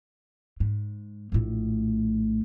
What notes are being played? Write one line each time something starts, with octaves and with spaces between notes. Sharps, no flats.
G#2
A#1 A2